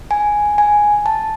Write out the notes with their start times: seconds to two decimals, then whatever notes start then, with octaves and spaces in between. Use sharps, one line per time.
0.11 G#5
0.58 G#5
1.06 A5